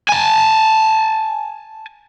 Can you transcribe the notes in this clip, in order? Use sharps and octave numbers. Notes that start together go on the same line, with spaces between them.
G#5 A5